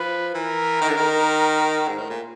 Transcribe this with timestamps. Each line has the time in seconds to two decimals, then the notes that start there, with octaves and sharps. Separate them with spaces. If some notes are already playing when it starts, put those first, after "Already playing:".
Already playing: F3 B4
0.35 E3 A#4
0.81 D#3
0.89 D3
0.96 D#3
1.88 G#2
1.98 A2
2.10 A#2